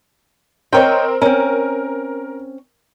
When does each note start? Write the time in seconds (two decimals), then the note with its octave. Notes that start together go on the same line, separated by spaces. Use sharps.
0.73 C4 A#4 C#5 D#5 G5
1.22 C4 C#4 A#4